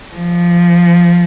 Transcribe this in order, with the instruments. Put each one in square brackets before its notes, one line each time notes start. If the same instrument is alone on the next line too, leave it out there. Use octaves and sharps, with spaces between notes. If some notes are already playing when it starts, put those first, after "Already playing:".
[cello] F3